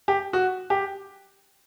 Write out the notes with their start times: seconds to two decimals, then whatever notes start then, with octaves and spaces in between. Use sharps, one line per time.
0.08 G4
0.33 F#4
0.70 G4